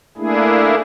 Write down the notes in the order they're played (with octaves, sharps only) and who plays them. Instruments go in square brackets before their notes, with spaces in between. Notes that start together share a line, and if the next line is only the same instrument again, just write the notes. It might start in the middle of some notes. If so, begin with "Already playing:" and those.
[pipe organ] A3 A#3 D4 E4 G#4